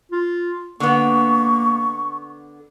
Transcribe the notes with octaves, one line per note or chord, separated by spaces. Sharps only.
F4
D3 A#3 B3 C#6